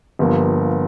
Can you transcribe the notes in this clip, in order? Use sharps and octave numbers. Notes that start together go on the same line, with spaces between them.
G1 G2 F3 A#3